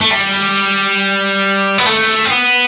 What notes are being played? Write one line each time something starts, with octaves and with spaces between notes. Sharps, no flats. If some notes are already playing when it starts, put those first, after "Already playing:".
A3
G3
B3
A3
C4
B3